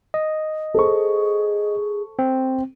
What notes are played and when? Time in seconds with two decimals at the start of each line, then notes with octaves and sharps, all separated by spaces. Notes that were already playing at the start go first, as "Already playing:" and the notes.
0.14 D#5
0.74 G#4 A4 C5 C#6
2.19 C4